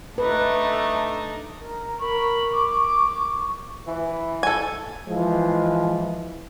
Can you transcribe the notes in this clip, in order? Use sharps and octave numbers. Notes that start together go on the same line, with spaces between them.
A3 D4 D#4 B4
A#4
A#4 B5 C#6
D6
E3
A4 G#5
E3 F3 G#3